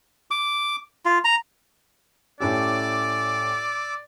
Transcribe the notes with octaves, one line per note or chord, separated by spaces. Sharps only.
D6
F4
A#5
A2 C#4 G4 D5 D6 E6